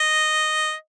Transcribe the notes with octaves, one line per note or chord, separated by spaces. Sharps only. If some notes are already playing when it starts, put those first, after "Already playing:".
Already playing: D#5